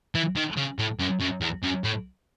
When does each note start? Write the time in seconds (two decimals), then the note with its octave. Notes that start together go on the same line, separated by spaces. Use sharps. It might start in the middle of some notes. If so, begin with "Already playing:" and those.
0.15 E3
0.36 D#3
0.57 C#3
0.79 A2
1.00 F#2
1.20 F#2
1.41 E2
1.63 F#2
1.84 A2